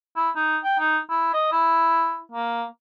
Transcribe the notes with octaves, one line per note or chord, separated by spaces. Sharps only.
E4
D#4
G5
D#4
E4
D#5
E4
A#3